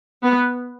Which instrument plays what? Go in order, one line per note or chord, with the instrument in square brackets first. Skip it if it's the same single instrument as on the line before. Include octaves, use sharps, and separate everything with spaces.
[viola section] B3